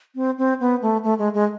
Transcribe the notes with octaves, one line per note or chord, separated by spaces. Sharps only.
C4
C4
B3
A3
A3
G#3
G#3